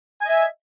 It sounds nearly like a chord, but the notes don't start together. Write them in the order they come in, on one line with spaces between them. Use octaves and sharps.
G#5 D#5 E5